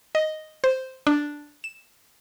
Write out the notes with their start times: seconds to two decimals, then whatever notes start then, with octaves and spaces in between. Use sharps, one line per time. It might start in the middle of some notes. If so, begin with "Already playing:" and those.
0.15 D#5
0.64 C5
1.07 D4
1.64 E7